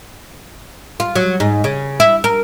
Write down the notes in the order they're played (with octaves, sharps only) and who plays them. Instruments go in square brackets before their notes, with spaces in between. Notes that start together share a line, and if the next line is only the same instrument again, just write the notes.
[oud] F4
F#3
G#2
C#3
E4
A#4